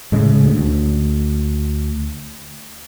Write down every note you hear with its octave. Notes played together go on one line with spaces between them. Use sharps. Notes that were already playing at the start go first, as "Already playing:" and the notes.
A2 C#3 G#3
D2